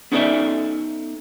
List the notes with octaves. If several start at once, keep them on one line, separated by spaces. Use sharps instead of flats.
B3 C#4 D#4 A4 D5 E5